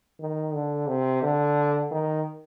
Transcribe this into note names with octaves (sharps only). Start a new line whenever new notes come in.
D#3
D3
C3
D3
D#3